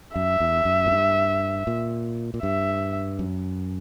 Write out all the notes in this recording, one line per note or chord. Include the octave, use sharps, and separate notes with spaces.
F#2 E5
E2
F#2
A#2
G2
A#2
A#2
G2 E5
F#2